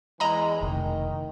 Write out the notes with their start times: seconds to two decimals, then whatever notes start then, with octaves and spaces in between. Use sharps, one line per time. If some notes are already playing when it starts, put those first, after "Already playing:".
0.20 E2 E3 G#3 D#5 A#5 B5
0.61 F1 B2 D#3